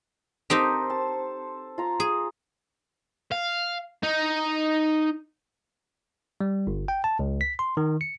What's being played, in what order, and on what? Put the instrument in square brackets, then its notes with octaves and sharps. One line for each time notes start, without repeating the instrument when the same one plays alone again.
[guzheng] C4 D#4 G4 [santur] A4 A#4 C5
[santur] A5
F4 A#5
[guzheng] G#4
[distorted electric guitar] F5
D#4
[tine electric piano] G3
G1
G5
A5
C#2
B6
C6
D#3
C#7